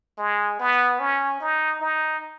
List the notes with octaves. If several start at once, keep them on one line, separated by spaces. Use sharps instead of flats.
G#3
B3
C#4
D#4
D#4